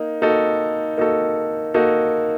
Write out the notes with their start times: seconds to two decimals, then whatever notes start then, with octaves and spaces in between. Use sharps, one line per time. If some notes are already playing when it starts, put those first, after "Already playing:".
Already playing: A#3 D#4
0.22 A#3 D#4 F#4 A4
0.98 A#3 D#4 F#4 A4
1.74 A#3 D#4 F#4 A4